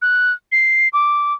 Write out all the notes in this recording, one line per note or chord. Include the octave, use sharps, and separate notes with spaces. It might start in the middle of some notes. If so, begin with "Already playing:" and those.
F#6
C7
D6